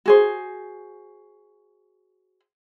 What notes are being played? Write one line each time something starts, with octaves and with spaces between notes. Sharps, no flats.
F#4 G#4 C5